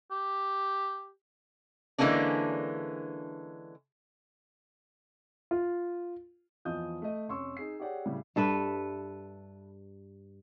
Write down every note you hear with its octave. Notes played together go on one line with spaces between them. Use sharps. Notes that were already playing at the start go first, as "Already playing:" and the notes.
G4
D3 E3 G#3 A#3 C#4 D4
F4
E2 F3 F4 D#5 D#6 G6
A3 D#5
F1 C#4 C6 C#6 E6
D#4 G#4 C7
G4 G#4 C#5 D5 F#5 G5
A2 C#3 G3
G2 A4 B4 E5